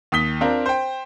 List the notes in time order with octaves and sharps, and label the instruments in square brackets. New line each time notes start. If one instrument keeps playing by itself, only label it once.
[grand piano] D#2 D#6 B6 G7
C4 D4 F4 A#4
C5 G5